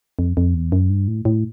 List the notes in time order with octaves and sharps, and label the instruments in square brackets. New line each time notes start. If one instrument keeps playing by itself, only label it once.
[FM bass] F2
F2
E2
F#2
G2
A2
A2